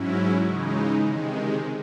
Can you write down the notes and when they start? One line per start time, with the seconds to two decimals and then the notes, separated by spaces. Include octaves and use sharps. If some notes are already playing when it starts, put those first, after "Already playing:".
Already playing: G#2 F#3 C#4 E4
0.42 C#3 E3 G#3 D#4
1.05 C3 D#3 G#3